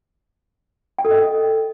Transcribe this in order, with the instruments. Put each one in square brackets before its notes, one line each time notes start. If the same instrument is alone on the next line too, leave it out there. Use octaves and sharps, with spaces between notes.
[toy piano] G5
A4
D#5